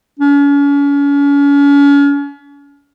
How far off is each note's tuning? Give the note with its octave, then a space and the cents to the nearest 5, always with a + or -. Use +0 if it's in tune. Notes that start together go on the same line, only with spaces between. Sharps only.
C#4 +40